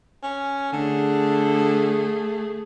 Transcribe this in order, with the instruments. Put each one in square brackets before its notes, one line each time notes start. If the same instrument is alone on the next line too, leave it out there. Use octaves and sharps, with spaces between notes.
[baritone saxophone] C#4
[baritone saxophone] D3 [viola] A3 G#4